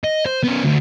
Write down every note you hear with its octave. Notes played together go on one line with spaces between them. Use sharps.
D#5
C5
B3 C#4
D2